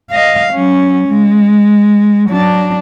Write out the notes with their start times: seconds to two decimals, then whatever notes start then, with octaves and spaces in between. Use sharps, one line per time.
0.11 D#5 F5
0.53 F#3 C#4
1.08 G#3
2.29 F#3 D4